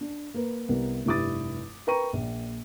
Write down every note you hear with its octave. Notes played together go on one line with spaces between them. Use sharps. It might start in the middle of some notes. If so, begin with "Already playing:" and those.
D4
A#3 A#4 B4
C2 B3 A#4
F1 G2 E4 D6 D#6 A6
A#4 B4 G5 A#5 C#6 D#7
A#1 A#2